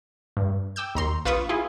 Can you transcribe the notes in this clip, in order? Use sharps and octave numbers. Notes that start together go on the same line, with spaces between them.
G2
G5 D6 E6 G6
D#2 A#5 C6
A#1 F4 B4 B5 C#6 D#6
E4 F4 G#4